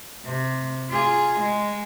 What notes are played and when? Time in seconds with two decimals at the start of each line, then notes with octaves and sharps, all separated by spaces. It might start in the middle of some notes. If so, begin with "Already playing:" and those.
0.25 C3
0.89 F4 G#4
1.39 G#3